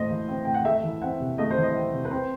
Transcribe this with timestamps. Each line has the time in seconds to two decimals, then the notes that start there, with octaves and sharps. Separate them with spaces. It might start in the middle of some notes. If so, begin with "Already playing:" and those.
Already playing: A2 E3 A3 C4 C5 D#5
0.10 E3
0.28 C4
0.45 A2 G5
0.54 F#5
0.65 A3 E5
0.83 E3
1.02 C4 F#5
1.20 C3
1.38 A3 D#5
1.51 C5
1.57 E3
1.63 D#5
1.75 C4
1.93 C3
2.05 B4
2.11 C4 C5